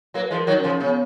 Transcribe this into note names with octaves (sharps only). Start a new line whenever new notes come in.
F#3 A#3 B4
F3 G#3
A#4
D#3 F#3
C#4
C#3 F3
C#3 B3